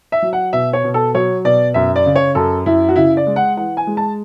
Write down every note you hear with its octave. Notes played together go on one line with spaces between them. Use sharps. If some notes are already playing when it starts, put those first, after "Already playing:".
E5
F#3
F#5
B2 E5
C#5
B2
A4
F#3 C#5
B2 D5
F#2 E5
D5
C#3
C#5
F#2 A4
F#2 E4
F#4
C#3 E4
D5
G#3
F#5
E3 F#5
G#5
G#3
A5